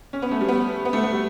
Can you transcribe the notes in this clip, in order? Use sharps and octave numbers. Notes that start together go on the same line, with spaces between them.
C#4
B3
A3
G3
B3
B3
A3
B3
G3